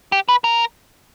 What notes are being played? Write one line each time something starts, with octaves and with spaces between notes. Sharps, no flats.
G4
B4
A#4